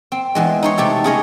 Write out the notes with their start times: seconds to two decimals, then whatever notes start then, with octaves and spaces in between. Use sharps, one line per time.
0.12 C4
0.35 E2 E3 G#3
0.63 D#4 C5 C#5
0.78 C3 A3 G4 A4
1.04 C#3 G#4 C#5 D#5